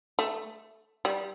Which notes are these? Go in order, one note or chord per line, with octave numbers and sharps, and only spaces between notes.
A3
G3